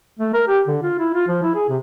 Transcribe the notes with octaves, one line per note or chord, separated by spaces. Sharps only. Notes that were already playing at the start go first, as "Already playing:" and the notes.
A3
A#4
G4
D3
F4
E4
F4
F3
E4
G#4
C3